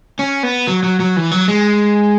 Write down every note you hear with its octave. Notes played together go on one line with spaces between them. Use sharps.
C#4
B3
F#3
F#3
F#3
E3
F#3
G#3